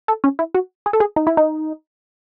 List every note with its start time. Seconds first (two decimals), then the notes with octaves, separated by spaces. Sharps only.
0.08 A4
0.24 C#4
0.39 E4
0.54 F#4
0.86 G#4
0.93 A4
1.00 G#4
1.16 D#4
1.27 E4
1.37 D#4